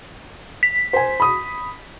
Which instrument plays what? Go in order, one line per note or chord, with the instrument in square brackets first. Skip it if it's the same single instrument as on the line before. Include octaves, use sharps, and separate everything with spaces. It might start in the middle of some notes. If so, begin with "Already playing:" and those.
[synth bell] B6
[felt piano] C5 G#5
B5 D#6